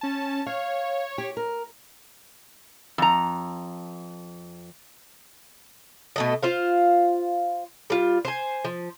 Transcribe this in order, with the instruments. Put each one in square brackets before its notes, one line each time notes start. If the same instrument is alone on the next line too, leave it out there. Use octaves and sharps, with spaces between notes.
[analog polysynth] C#4 A5
[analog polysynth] C#5 [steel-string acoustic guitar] F5
[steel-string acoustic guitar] G4
A#4
[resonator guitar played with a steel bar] F2 A#5
[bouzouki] B2 A3 D#5
F4 C5 F5
G3 F4
C5 G#5
F3